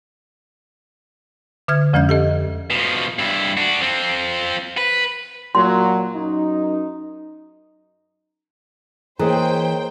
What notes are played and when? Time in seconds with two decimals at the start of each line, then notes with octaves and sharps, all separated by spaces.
1.68 D3 E5 F6 G#6
1.93 F2 F3 G#3 C#4 E5 G6
2.09 G4 A4 D#5
2.71 B2 F3
3.19 G2 E4
3.57 D4 F#4
3.81 F3 C4
4.77 B4
5.55 A#2 F#3 C6
6.15 F#2 D#4
9.19 E3 A#3 G#4 C5 C#5 D#5 G5 A#5